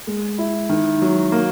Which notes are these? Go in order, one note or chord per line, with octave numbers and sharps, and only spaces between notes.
G#3
E4
D#3
F#3
A#3